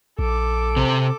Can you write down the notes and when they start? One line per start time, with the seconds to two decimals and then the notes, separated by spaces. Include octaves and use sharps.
0.19 A#1 A4 D6
0.76 C3 C4